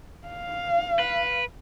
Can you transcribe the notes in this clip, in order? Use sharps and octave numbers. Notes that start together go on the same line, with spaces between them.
F5
B4